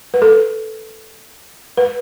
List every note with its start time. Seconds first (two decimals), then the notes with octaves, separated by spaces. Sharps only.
0.14 B4
0.22 A4
1.77 B4